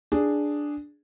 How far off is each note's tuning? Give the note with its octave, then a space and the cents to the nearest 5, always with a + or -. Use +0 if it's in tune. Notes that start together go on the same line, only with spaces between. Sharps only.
D4 +0 G#4 +0